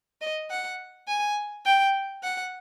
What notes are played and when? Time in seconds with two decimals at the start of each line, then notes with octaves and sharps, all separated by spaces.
0.21 D#5
0.50 F#5
1.08 G#5
1.65 G5
2.23 F#5